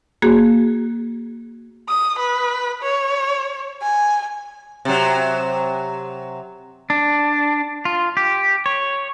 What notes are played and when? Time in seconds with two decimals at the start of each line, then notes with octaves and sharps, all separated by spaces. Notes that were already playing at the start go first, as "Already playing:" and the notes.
0.22 A#3 F#4 G#4
1.89 D#6
2.19 B4
2.83 C#5
3.82 G#5
4.85 C3 F#3
6.90 D4
7.85 F4
8.17 G4
8.66 C#5